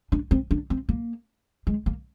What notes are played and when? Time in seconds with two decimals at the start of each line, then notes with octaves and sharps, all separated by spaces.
0.12 D4
0.31 C4
0.51 D4
0.70 C4
0.89 A#3
1.67 G#3
1.86 A#3